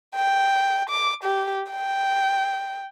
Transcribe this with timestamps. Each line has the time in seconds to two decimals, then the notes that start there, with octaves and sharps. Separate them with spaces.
0.16 G5
0.90 D6
1.24 G4
1.71 G5